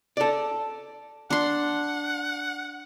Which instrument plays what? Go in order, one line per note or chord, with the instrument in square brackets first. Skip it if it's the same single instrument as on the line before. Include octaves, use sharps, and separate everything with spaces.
[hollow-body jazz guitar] A4 D5
[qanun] D4 C6 [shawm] F#5